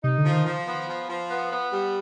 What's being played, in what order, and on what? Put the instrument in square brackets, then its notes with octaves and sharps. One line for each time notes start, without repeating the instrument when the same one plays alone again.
[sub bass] C3 [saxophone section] D#4
[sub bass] D3
[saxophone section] F3
[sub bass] D#3
[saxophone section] F3
B3
F3
F3
B3
B3
G3